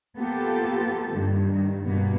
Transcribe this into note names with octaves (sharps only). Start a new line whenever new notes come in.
A#3 B3 F4 G4 A4
G2 D#3
G2 B2 A#3 B3